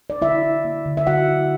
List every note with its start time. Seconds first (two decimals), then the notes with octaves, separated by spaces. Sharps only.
0.10 D5
0.22 D3 E4 E5
0.43 E4
0.64 A#3
0.86 D3
0.97 E5
1.07 D3 F#4 F#5
1.28 E4